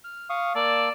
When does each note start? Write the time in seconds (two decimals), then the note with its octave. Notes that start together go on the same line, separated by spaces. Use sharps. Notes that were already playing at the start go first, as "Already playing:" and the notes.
0.04 F6
0.30 F5 C#6 D#6
0.55 A#3 D5 A5 E6